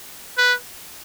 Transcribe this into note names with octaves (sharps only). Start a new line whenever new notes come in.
B4